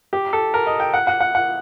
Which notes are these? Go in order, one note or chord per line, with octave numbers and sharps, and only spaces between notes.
G4
A4
A#4
D#5
G5
F#5
F#5
F#5
F#5